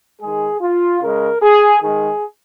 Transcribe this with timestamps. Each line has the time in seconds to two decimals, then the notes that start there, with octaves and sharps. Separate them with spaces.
0.21 D#3 G#3 G#4
0.61 F4
1.01 C#3 G#3 A#4
1.42 G#4
1.81 D#3 G#3 G#4